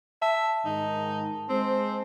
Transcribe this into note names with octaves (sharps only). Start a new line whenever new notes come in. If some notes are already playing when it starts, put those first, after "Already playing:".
E5 A5
G#2 D#3 D#4
G#3 C4 C5